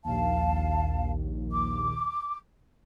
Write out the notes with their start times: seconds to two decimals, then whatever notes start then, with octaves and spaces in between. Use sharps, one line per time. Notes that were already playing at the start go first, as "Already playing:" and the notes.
0.04 A#1 D#2 F5 A5
1.51 D6